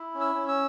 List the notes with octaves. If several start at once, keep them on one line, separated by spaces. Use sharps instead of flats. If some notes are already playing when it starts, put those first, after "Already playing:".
Already playing: E4
C#4
E6
C#4
E6